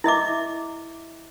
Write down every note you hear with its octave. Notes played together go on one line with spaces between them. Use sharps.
E4 D#5 E5 D6